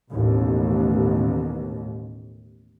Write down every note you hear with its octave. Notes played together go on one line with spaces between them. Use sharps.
A1 D#2 B2